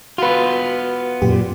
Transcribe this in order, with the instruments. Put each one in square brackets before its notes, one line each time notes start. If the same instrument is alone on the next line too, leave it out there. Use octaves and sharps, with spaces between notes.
[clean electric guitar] B3 F4 [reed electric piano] F#4 B4
[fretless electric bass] F#2 A#2 [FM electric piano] G4